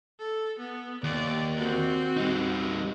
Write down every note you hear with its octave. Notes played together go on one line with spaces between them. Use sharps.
A4
B3
D#2 D5
C4 F#4
G3 D#4